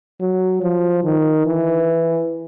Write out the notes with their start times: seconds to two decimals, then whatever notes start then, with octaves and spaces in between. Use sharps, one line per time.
0.21 F#3
0.62 F3
1.04 D#3
1.46 E3